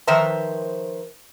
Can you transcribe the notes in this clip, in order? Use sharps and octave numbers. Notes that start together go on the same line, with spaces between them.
D#3 F3 B4 C5 E5 A#5